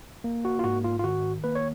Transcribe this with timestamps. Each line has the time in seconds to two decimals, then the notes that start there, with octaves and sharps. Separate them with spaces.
0.24 A#3
0.45 F#4
0.59 F4
0.64 G#2 F#4
0.84 F4
0.99 F4
1.04 D#3 F#4
1.44 A#3 B4
1.55 C#5